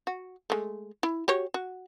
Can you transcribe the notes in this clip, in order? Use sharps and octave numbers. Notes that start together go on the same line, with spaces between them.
F#4
G#3 A3
E4
F#4 G4 C#5
F#4